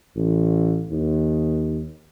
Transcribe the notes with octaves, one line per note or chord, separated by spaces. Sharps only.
A1
D#2